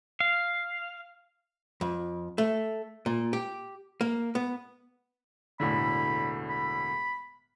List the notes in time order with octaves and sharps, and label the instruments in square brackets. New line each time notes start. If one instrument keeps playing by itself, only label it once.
[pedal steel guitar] F5
[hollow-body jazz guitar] F2
A3
A#2
G4
A#3
B3
[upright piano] E1 A2 D3 [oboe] B5
[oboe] B5